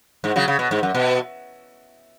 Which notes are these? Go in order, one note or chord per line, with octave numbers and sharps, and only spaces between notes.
G#2
C#3 F#3
C#3
B2
G#2
F#2
B2